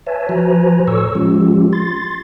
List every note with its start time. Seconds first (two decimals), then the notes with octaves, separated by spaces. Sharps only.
0.06 B4 C#5 E5 G#5 A5
0.29 F3 F#4 B4 C5 G#5 A#5
0.88 A2 A4 C#5 C#6 E6
1.15 F3 G#3 C#4 F4 G4
1.73 C6 A6